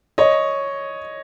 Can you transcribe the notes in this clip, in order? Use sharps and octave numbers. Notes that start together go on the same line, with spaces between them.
C#5 D#5